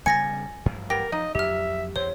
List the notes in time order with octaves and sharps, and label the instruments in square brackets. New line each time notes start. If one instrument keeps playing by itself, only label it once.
[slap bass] C#3 G3 B3 [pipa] G#5 [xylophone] A6 A#6 C#7
[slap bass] A1 G2 F3
[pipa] B3 G4 [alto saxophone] A#4 [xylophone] A#6
[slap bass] F3 [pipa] D#4 [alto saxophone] D#5
[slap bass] F2 F#3 [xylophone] G4 F6 [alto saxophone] E5
[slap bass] E2 [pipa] C5 [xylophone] C#5